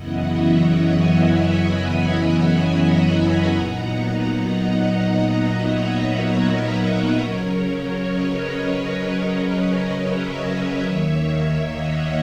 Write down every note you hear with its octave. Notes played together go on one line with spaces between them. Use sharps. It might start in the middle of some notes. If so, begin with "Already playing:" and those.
Already playing: F#2 C#3 E3 B3 E4 D#5 F#5
C#5 E5
C#5 E5
E5 G#5
G#5 B5
G#5 B5
F#5 A#5
A#2 F#3 B3 D#4
D#5 F#5
C#5 E5
B4 D#5
A#4 C#5
C#3 F#3 C#4
B4 D#5
C#5 E5
D#2 D#3 A#3
D#5 F#5